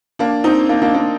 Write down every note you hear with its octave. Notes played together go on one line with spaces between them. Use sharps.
A#3 D4
C4 D#4
A#3 D4
A#3 D4
A#3 D4